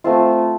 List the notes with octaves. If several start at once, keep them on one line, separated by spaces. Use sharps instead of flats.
A3 C4 F4